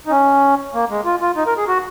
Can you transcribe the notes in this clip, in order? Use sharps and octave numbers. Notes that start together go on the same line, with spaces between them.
D#4
C#4
A#3
G#3
F4
F4
D#4
A#4
G#4
F#4